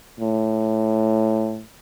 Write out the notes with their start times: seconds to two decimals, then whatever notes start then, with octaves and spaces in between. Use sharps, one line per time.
0.20 A2